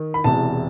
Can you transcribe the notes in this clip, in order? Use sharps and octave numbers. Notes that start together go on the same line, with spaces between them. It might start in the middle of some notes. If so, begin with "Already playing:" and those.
Already playing: D#3
B5
E1 E2 C3 E3 A5